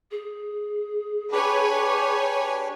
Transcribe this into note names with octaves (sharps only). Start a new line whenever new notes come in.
G#4
D4 G4 B4 C#5 G#5